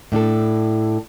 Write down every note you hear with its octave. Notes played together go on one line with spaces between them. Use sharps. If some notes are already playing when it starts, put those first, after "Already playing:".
A2 D4 E4 A4